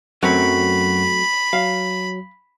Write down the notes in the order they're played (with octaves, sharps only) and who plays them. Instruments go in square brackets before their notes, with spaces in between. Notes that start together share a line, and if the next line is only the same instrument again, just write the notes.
[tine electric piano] F#2 F#5 C#6 [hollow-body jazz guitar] F#3 A3 C4 [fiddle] B5
[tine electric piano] F#3 [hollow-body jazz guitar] F5